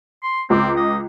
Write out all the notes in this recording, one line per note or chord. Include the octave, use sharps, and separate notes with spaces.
C6
C#2 C4 D6
D#5